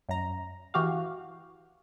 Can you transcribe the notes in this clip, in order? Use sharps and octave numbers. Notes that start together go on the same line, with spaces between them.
F#2 A#5
E3 F#4 G4 F5